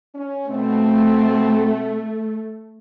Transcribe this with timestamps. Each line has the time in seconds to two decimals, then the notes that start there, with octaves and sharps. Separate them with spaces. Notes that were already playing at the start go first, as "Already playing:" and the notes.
0.15 C#4
0.49 B2 A3 C4